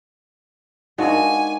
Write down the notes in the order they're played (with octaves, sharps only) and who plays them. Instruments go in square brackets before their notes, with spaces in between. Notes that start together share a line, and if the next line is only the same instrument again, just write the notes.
[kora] G#3 D4 F#4 [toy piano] D#4 A#4 [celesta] F5 F#5 [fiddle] G#5